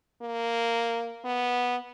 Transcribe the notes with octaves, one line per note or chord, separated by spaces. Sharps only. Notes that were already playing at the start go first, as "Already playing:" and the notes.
A#3
B3